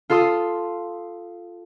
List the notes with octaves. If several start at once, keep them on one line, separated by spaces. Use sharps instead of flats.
F4 A4 F5 C6 D#6